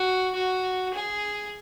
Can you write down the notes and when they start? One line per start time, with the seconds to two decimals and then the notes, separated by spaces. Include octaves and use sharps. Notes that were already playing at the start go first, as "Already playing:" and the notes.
Already playing: F#4
0.35 F#4
0.94 G#4